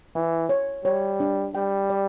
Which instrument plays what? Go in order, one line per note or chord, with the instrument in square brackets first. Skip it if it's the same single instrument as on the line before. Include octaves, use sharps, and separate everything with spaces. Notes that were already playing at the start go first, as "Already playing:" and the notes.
[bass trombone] E3 [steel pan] E4
[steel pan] C#5
[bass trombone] G3 [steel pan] C#5
[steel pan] D4
[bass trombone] G3 [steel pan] G5
[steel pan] D5